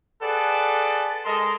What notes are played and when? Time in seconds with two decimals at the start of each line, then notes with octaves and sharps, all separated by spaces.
0.21 G#4 A4 B4 D5 F#5
1.24 G#3 A4 A#4 D#5 C6